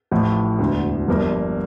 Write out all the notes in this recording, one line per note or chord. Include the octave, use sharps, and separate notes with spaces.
A1 A2 F3
E1 D2 D3
G1 G2 F3 A#3